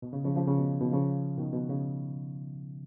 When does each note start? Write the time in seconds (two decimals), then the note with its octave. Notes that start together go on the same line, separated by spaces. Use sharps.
0.02 B2
0.13 C#3
0.24 C#3 F3
0.36 C#3 F3
0.47 C#3
0.58 B2
0.81 B2 D#3
0.92 C#3 F3
1.38 B2 D#3
1.53 B2
1.69 C#3